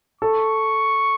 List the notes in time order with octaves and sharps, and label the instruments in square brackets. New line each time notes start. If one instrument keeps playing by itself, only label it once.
[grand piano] A4 [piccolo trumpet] C#6